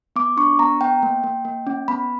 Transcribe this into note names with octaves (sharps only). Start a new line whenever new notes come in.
B3 D6
D4 C#6
B3 A#5
B3 G5
A#3
A#3
A#3
C#4
B3 B5